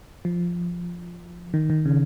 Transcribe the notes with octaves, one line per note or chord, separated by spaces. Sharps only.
F3
D#3
D#3
C#3